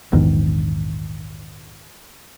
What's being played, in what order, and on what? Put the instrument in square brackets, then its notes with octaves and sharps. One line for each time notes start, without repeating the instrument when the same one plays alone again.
[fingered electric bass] A#1 E2 G#2 D#3